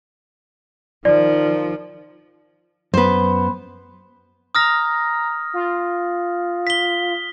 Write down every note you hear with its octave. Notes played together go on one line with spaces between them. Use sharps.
D#3 F3 D5
F#2 B3 B4 C5
A#5 D#6 F6 A#6
F4
B6 G7